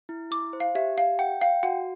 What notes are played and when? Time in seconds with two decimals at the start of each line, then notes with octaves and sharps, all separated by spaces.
0.09 E4
0.31 E4 D6
0.53 C5
0.60 F5
0.75 G4 E5
0.97 G4 F5
1.19 F#5 G5
1.41 F5 G5
1.63 F#4 F#5